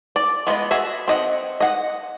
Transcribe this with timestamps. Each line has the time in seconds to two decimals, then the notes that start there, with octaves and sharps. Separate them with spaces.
0.16 D5
0.47 G#3 B3 F4 D#5
0.71 F#4 G#4 E5
1.08 C4 D#5 F#5
1.60 D#5 F#5